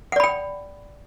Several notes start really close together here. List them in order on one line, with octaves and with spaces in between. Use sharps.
F#5 D5 B5 G5